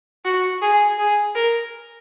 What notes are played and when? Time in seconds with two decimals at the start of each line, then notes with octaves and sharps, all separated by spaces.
0.25 F#4
0.62 G#4
0.98 G#4
1.35 A#4